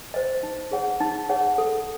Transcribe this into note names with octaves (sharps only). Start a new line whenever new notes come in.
C5 D#5
D#4
G#4 C#5 F#5
D#4
G#4 C#5 F#5
A4